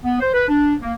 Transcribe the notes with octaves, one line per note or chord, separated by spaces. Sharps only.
B3
C5
B4
D4
A#3